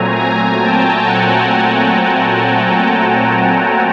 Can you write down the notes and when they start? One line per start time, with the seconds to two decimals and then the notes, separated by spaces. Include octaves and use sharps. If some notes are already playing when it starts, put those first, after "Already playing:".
Already playing: A#2 F#3 A3 C4 G#5 A#5
0.15 G#5 A#5
0.59 G5 A5
1.03 F#5 G#5
1.47 G5 A5
1.92 F#5 G#5
2.36 G5 A5